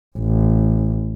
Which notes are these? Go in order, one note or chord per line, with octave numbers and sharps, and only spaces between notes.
A1